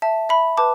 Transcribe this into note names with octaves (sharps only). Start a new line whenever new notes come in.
E5 A5
E5 B5
B4 A5 D6